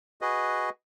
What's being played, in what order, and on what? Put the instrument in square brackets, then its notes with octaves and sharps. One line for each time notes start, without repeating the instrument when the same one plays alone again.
[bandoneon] F#4 G#4 B4 D#5